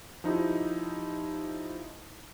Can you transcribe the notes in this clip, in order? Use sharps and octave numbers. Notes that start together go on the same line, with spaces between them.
F3 D#4 E4 G4